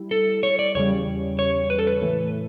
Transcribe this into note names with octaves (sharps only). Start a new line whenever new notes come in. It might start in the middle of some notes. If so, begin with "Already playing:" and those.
Already playing: G3 E4
A4
C#5
D5
E2 C#3 G3 C#5
C#5
B4
A4
B4
A2 E3 A3